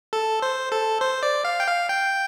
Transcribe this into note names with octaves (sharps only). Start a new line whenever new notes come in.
A4
C5
A4
C5
D5
F5
G5
F5
G5